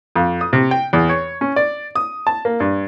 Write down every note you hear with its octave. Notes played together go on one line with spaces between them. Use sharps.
F2
D#6
C3
G5
E2
C#5
C#4
D5
D#6
A5
A#3
G2